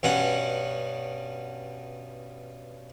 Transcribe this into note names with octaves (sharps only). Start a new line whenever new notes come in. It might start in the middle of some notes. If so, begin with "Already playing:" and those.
G2 B2 C#4 F#5